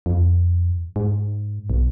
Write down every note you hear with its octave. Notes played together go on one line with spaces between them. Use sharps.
F2
G#2
B1